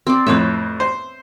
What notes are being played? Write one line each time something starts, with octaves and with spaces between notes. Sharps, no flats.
C4 D5
F2 A2 B4 C#5 E5
C5